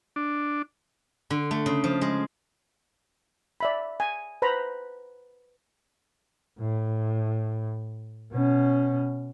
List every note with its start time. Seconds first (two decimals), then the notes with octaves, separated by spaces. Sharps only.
0.16 D4
1.30 D3
1.51 A3
1.66 C#3
1.84 F3
2.01 G#3
3.60 D5 E5 B5
4.00 G#5
4.42 B4 C5 A#5 B5
6.60 A2
8.32 B2 C#4